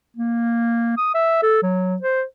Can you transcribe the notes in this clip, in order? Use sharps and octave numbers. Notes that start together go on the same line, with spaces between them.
A#3
D#6
E5
A4
F#3
C5